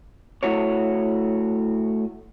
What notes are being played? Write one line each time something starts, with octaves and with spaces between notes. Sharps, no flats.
A3 E4 F#4 C#5